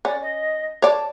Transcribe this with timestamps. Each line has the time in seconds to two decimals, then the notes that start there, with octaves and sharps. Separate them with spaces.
0.05 C#4 D5
0.22 D#5
0.82 C#5 D5 A5